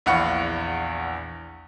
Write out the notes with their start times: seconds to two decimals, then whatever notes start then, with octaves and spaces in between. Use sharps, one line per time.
0.06 A#1 E2 F5 F#5 B5 C#6